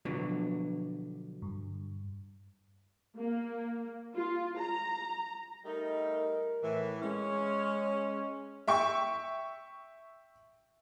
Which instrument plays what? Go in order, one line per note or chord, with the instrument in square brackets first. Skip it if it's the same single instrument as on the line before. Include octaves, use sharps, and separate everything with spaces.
[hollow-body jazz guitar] B2 D3 F#3 [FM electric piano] F3
[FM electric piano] G2
[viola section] A#3
F4
A#5
[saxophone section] G3 A3 D#4 [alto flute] A#4
[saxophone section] A2 E3
[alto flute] G#3 [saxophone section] C#4
[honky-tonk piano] E5 G5 C#6